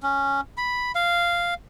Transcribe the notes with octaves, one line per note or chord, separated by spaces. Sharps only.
C#4
B5
F5